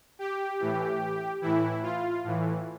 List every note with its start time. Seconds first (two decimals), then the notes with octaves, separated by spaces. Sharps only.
0.19 G4
0.60 A2 E3
1.42 A2 E3 E4
1.83 F4
2.24 A2 E3